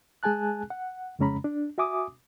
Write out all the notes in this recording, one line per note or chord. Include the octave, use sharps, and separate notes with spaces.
G#3 G#4 G#5 A5 F#6
F#5
F2 C#3 G#3 C#4 A#5 B5
D4
F#4 E5 G#5 D6 D#6